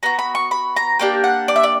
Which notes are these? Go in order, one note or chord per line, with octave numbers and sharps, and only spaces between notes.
B3 F#4 A#5
B5
C#6
B5
A#5
A#3 D4 G4 G5
F#5
D5
E5
D5